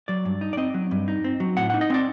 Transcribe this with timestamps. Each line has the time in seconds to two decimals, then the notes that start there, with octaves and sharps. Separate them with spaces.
0.08 F#3 D5
0.25 G2
0.41 D#4
0.53 D5
0.57 C4 D#5
0.74 F#3
0.91 G2
1.08 D#4
1.24 C4
1.40 F#3
1.57 A2 F#5
1.70 D#4 F#5
1.81 D#5
1.90 C4 D5